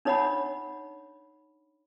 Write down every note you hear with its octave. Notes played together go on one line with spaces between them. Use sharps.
D4 D#4 C#5 D#5 F#5 B5